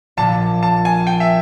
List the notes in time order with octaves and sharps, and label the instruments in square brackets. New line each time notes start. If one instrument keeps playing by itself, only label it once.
[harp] A#1 A#2 F3 [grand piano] A5
[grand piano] A5
G#5
G5
E5